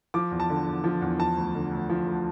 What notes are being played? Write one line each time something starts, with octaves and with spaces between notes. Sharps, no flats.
F3 D6
E2
A5
D3
E2
F3
E2
F3 A5
D2
D3
D2
F3
D2